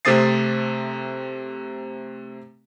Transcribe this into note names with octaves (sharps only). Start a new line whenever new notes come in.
C3 A3 C4 D#6 A6 C7